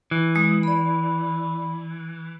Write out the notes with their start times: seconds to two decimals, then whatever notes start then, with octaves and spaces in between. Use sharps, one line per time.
0.11 E3
0.35 G#3 D#6
0.63 D5 B5